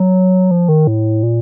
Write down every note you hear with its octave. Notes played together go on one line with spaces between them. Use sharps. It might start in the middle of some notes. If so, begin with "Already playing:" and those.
Already playing: F#3
F3
D#3
A2
A#2